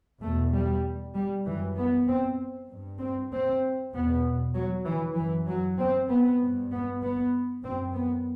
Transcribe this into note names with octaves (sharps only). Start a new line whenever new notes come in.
E2 B2 A3
G3
G3
F#2 E3
B3
C4
G2
C4
C4
E2 B2 B3
F#3
E3
F#2 E3
F#3
C4
B3
G2
B3
B3
F#2 C4
B3